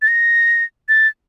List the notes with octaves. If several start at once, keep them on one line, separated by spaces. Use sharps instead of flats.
A6
A#6
A6